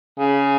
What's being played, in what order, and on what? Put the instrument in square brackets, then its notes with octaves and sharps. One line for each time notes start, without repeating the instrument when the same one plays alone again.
[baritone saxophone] C#3